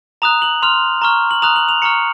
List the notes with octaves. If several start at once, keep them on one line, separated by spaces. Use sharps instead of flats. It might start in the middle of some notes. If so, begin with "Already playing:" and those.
A#5 D#6 F#6 F7
F#7
C6 F6 F7
A#5 C#6 F6
F#7
A#5 D#6 F#6 F7
F#7
F7
A#5 C#6 F6 C#7